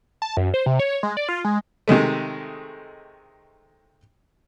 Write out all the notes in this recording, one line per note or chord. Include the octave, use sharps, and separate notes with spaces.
A5
F#2
C5
C3
C#5
G#3
D5
F4
G#3
C3 D#3 G#3 A3